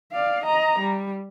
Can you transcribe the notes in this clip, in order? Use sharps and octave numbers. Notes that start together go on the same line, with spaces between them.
D5 F5
D#5 A#5
G3